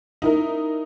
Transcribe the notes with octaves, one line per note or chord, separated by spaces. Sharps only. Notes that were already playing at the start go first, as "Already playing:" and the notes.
D#4 E4 A#4